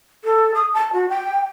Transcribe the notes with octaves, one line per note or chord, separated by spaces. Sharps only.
A4
D#6
A5
F#4
G5